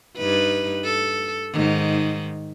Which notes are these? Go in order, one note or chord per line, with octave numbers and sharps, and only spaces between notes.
G2 D#4 B4
A4
G#2 D#3